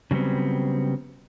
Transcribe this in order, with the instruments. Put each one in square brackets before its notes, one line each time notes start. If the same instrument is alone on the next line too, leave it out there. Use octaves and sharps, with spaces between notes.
[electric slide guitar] C#3 F#3 G3 B3 C4